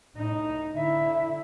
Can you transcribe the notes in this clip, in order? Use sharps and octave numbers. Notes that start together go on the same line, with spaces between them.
A2 D#4
D3 E4 E5